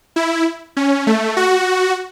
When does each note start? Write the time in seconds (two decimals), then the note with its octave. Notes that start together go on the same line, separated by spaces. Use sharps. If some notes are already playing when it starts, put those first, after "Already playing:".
0.16 E4
0.77 C#4
1.07 A3
1.37 F#4